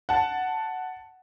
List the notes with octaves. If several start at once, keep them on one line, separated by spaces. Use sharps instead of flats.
F#5 A5